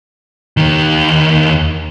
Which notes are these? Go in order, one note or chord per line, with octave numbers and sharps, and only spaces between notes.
D#2 D#3